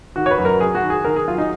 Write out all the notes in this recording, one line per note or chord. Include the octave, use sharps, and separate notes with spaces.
D#3 F#4
C#5
B4
F#2
A#4
F#3 G#4
F#4
D#3
G#4
D#3 A#4
G#4
F#3 F4
D#4